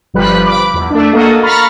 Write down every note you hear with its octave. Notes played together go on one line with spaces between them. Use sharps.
G1 F3 G3 B4 B5 F#6
B5 D6
E2
A3 D4
A#3 F#4 A4 D#5
F5 A#5 B5 C#6 F6 A6